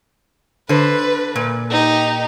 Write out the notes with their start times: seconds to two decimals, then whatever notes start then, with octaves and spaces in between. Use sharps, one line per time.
0.69 D3 B4 C5
1.36 A#2
1.71 D#4 G4